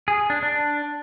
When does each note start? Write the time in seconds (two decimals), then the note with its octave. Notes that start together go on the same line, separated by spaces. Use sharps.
0.08 G#4
0.30 D4
0.43 D4